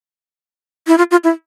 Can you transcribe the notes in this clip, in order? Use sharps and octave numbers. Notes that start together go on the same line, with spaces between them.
E4
F4
F4
E4